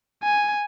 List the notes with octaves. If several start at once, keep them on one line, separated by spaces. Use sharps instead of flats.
G#5